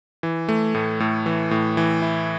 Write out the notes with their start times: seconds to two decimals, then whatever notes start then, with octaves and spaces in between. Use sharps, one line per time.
0.23 E3
0.49 A3
0.75 A2
1.00 A2
1.26 E3
1.51 A2
1.77 E3
2.02 E4